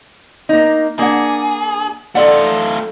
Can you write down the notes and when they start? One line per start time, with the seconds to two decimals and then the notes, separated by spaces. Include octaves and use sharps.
0.49 A#3 D#4
0.99 A#3 D4 G#4 F#5
2.15 A3 F4 A4 D5 F#5